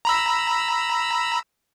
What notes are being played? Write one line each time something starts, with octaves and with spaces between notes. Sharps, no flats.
A#5 B5 E6